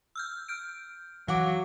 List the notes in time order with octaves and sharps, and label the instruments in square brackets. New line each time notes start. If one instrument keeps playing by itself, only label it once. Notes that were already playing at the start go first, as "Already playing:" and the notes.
[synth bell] E6 F6 G6
F6 G6 D7
[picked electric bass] E3 [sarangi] F#3 [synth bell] F5 F#6 [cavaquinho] F#5 D6